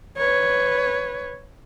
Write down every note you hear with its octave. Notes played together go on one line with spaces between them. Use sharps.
B4 C#5